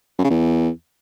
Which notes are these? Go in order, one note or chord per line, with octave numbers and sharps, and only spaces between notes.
F#2
C#3
E2